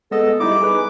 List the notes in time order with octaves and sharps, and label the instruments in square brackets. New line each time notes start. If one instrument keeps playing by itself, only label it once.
[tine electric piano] G#3 B3 D#5 [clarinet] A4
[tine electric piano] G3 D#4 E4 [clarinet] D6
[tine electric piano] G#4 B4